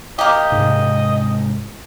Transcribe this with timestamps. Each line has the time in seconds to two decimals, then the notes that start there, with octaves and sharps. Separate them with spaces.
0.19 A#3 G4 D#5
0.52 G#2 C3 G#3